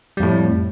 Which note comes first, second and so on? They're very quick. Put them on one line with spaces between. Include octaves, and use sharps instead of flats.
G3 F2 A2